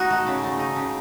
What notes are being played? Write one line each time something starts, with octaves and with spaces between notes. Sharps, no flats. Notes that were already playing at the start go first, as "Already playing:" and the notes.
Already playing: D#4 F#4
A3
C#3
A3
D#4
C#3